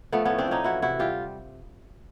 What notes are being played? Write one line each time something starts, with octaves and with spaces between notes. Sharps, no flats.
F3 A3 B3
A2 B3 C#4
C4 D4
F3 C#4 D#4
E3 E4 F#4
C3 E4 F#4
G3 F4 G4